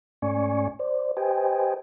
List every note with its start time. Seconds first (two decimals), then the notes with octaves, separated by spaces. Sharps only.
0.22 G#2 A3 C#4 D5 G#5 C#6
0.79 C5 D5
1.17 G4 B4 C5 D#5 G5 G#5